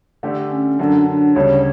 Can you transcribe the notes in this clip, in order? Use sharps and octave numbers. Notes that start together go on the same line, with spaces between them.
D3 A3 D4 G4
C#4
F#2 D3 F#3 D4
D4
D2 C#3 G3 C#5